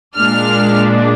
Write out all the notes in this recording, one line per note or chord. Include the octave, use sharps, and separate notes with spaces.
A#2 G#3 D4 F6